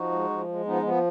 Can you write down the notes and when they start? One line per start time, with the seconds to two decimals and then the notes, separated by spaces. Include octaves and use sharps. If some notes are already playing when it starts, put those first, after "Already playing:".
Already playing: F3 D#4 F#4
0.11 G#3
0.30 F3
0.48 G#3
0.65 F3 B3 D#4
0.83 F3 B3